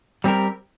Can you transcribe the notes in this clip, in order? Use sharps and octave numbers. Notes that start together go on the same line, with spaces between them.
G3 C4 G4 A#4